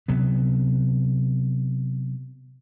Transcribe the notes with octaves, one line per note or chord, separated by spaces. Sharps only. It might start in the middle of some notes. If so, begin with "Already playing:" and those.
C3 F#3 B3